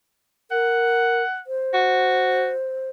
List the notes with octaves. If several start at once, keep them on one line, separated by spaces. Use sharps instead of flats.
A#4 F#5
C5
F#4